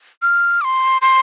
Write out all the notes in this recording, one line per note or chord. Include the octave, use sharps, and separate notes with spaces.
F6
D6
C6
C6